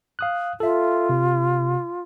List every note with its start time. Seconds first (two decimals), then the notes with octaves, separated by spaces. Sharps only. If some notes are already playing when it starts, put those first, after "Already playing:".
0.19 F5 D#6 F#6
0.60 F4 A4 E5
1.09 C3